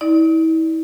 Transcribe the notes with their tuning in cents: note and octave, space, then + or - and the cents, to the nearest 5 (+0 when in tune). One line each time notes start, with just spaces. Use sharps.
E4 -40 D5 +10